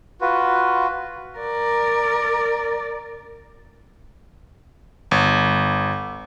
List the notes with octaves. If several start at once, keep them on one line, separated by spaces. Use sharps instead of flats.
F4 F#4 B4
A#4 D5
G1